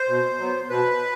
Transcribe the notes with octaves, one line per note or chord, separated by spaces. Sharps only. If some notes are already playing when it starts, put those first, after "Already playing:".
Already playing: C5
B2
F#3 B3
B2 B4